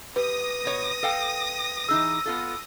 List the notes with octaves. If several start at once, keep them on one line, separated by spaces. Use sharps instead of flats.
G4 B4 D#6 A#6
B2 C#5
A4 F5 G5
E3 D#4 G#4 E6
B3 F4 A4